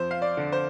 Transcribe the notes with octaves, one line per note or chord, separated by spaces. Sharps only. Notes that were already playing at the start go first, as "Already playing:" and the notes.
Already playing: F2 C5
F5
D5
D3
C5